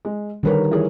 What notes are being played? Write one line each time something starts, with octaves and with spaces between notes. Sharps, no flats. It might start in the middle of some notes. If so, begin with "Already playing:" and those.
G#3
D3 D#3 G3 A#4 B4 C#5
E3 G#4 C#5